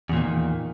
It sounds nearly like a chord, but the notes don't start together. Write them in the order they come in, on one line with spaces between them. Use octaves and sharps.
E2 A#2 D#3